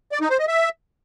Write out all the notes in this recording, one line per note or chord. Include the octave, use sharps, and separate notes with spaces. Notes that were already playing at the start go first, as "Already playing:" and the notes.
D5
D#4
C5
D#5
E5